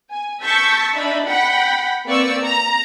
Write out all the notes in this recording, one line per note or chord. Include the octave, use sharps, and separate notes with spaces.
G#5
A5 C#6 E6 G6 A6 B6
D4 D#4 E5 B5
F#5 G5 B5 B6
A#3 C4 B4 D5 C#6 E6
A#5